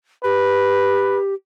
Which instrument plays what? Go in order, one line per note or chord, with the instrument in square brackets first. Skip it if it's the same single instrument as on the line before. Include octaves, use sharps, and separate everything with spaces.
[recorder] G4 [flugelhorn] B4